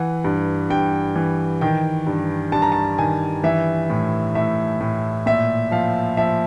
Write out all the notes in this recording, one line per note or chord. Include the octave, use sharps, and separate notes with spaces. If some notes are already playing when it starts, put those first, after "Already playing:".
Already playing: E3 F#5
G2
G2 G5
E3
D#3 G5
G2
G2 A5
A#5
A5
D#3 G#5
E3 E5
A2
A2 E5
A2
A#2 E5
F3 F5
F3 E5